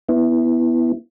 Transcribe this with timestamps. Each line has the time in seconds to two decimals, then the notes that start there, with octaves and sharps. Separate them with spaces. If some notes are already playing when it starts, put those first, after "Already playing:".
0.09 B3 E4